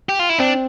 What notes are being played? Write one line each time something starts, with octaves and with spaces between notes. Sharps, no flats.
G4
F4
E4
C4 D4